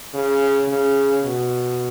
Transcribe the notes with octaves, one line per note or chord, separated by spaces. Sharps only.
C#3
C#3
B2